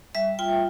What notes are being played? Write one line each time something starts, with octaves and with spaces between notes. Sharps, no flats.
G3 E5
F4 G5